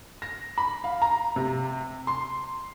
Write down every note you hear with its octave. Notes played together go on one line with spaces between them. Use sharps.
A#6
B5
F5
A#5
C3
C6